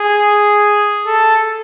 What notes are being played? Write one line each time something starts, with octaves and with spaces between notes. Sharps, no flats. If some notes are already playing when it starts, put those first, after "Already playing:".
Already playing: G#4
A4